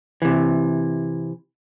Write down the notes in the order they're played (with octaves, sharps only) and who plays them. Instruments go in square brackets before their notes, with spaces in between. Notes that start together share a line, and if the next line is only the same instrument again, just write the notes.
[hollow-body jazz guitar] C3 E3